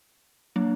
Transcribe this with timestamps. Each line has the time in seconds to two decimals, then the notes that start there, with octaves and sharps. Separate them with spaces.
0.56 F#3 A#3 D4